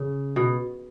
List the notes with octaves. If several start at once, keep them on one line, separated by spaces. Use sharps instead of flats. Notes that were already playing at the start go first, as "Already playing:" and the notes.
Already playing: C#3
B2